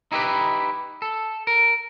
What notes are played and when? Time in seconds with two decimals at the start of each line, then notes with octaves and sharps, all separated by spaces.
0.12 D#4 E4 G4 G#4 B4
1.02 A4
1.47 A#4